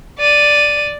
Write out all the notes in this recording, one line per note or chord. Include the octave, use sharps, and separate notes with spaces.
D5 D#7